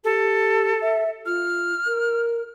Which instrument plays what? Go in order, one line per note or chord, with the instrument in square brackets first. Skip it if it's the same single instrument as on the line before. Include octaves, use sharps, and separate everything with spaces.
[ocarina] G4 [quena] A4
[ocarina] E5
[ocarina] F4 [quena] F6
[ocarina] A#4